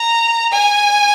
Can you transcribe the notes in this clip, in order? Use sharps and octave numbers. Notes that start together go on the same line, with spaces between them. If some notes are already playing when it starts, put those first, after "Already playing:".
Already playing: A#5
G#5